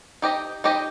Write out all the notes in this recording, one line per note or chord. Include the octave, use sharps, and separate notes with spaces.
D#4 G4 D#5
D#4 G4 D#5